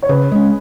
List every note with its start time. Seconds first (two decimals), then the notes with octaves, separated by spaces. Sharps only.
0.02 C#5
0.09 C#3 B4
0.32 G#3 C#4